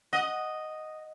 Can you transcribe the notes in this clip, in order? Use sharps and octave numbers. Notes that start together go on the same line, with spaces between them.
D#5 F#5